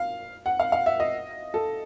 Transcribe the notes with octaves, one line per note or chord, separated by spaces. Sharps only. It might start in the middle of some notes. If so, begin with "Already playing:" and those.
Already playing: F5
F#5
F5
F5
E5
D#5
A4